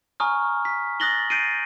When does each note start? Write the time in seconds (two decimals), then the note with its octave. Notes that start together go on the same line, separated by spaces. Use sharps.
0.20 G#5 A#5 C#6 D#6 F6
0.65 B6
1.00 D#6 F#6 A6 A#6 F#7 G7
1.30 G6 A6 C7 D7 D#7